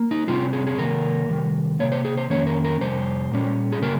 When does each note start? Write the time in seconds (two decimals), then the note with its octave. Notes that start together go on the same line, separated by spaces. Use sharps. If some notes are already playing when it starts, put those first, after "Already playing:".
Already playing: A#3
0.11 D#4
0.28 C3 G3 C4 F4
0.53 G#4
0.67 G#4
0.78 C3 D#3 A#3 A#4
1.29 C3 D#3 G3
1.79 C3 D#3 A#3 C#5
1.92 C5
2.05 G#4
2.17 C5
2.30 F2 D#3 A#3 C#4 C#5
2.47 A#4
2.64 A#4
2.80 F2 C3 G3 C5
3.32 A#2 G3 C#4
3.72 G#4
3.82 C#3 G3 A#3 A#4